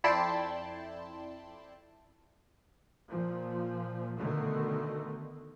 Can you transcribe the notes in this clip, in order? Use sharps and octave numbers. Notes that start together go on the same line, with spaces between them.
F2 E4 D5 G5 A5 C6
A#2 F3
B2 D3 D#3 A3